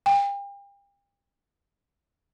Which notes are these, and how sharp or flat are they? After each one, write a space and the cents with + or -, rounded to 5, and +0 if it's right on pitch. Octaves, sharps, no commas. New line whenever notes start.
G5 +40